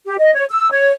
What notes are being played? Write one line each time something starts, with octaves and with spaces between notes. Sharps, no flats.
G4
D#5
C#5
E6
C#5